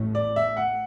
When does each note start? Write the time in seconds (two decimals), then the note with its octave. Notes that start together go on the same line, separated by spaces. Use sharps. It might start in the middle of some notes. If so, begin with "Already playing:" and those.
Already playing: A1 A2 A3
0.15 D5
0.36 E5
0.57 F#5